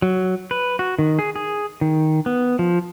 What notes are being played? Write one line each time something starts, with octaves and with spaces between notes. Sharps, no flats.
F#3
B4
F#4
D#3
G#4
G#4
D#3
B3
F3